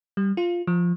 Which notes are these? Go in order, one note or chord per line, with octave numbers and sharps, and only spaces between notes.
G3
F4
F3